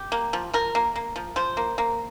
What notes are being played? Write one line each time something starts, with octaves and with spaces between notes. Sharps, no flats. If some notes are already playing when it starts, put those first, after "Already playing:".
Already playing: G4
A#3
F3
F3 A#4
A#3
A#3
F3
F3 C5
A#3
A#3